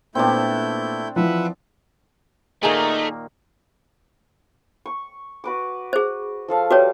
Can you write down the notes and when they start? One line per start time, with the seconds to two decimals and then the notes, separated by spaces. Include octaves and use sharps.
0.15 A#2 A3 B3 C4 D4 E4 G6
1.16 E3 F3 B4 E5 F#5
2.63 A#2 D#3 A3 A#3 D#4 G#4 G#5 A#5
4.86 C#6
5.44 F#4 B4 D6
5.93 G#4 C5
6.48 F3 A4 F5
6.71 G3 F#4 B4 C#5